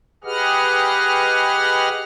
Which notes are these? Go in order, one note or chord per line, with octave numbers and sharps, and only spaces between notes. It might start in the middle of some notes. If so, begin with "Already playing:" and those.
G4 G#4 B4 D#5 F#5 F6